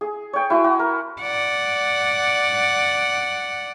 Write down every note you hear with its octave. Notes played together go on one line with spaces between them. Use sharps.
G#4
C#5 G5
E4 F#4 G#5 C6
F#4
A#4
D5 F#5